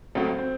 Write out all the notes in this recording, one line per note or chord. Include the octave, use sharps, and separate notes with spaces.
C#2 C#3 F#3 A3 C4
C4